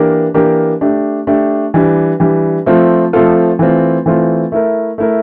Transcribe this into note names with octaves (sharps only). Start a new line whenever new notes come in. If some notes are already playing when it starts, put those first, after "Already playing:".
Already playing: E3 A#3 D4 G4 A#4
E3 A#3 D4 G4 A#4
A3 D4 G4
A3 D4 G4
E3 G3 D4
E3 G3 D4
F3 A3 C4 F4 A4
F3 A3 C4 F4 A4
E3 A3 C4 F4
E3 A3 C4 F4
A3 E4 A#4
A3 E4 A#4